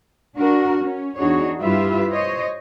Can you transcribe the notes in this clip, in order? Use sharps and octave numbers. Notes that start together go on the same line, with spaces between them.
D4 F#4 A#4
C#4
E2 D4 D#4 F#4 G#4 C#5
G2 E4 F4 G4 B4 E5
C5 C#5 D#5